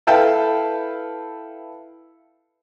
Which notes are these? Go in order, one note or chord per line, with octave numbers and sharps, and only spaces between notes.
E4 A4 B4 F5 G5 A5